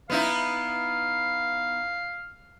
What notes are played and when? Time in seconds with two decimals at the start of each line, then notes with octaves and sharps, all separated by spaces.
0.10 B3 D#4 E4 F5